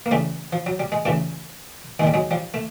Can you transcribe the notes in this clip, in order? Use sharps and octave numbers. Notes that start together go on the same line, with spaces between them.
A#3
C#2 C#3 E3 G3 A3
F3
F#3
G3
G#3
C#2 C#3 E3 G3 A3
D#2 D#3 G3 G#3
F#3 G#3
F3 G3
A3